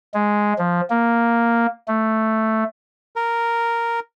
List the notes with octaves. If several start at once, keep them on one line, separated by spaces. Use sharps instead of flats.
G#3
F3
A#3
A3
A#4